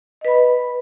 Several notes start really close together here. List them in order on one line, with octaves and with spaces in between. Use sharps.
D#5 B4 B5